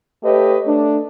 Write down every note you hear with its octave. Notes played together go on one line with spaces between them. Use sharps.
A3 G4 B4 C#5 D#5
A3 D4